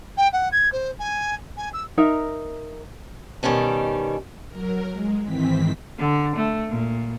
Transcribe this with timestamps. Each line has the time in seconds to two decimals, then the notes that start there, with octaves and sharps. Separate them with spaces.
0.17 G5
0.33 F#5
0.52 G#6
0.73 C5
0.99 G#5
1.57 G#5
1.73 E6
1.97 D#4 A#4 E5
3.43 B2 D#3 G3 C#4 A5
4.49 F#3 A#4
4.93 G#3
5.23 G#2 D#3 E3 C4 B6
5.98 D3
6.36 A3
6.69 A#2